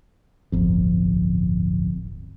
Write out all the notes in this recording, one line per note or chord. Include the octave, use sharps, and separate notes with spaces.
D1 G1 F2